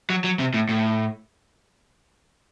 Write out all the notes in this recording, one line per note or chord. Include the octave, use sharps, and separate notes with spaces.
F#3
F#3
C3
A2
A2